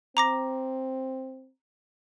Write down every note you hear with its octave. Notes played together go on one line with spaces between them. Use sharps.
C4 A#5 D6 A#6